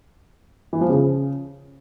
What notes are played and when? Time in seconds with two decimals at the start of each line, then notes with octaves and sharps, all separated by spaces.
0.73 E3
0.81 F3
0.89 C#3